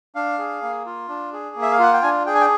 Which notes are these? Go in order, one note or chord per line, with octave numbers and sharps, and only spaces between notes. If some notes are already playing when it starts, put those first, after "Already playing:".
D4 F5
G#4
A#3
F4
D4
G#4
A#3
E5
F5
F4 F#5
G5
D4 G#5
G#4 G5
G#5
G5